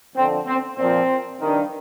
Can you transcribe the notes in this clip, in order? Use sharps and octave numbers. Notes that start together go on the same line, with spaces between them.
F2 D3 F3 C4
C4
A#2 F3 C4
G2 D#3